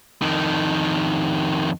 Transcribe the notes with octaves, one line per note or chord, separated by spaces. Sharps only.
F2 D#3